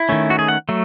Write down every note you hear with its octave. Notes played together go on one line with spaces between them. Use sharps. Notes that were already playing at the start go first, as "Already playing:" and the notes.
Already playing: E4
D#3 A3 C#4
F#4
G#4
F#5
F#3 A3